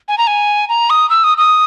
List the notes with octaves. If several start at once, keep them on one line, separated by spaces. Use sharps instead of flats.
G#5
A#5
G#5
A#5
D#6
E6
D#6
D#6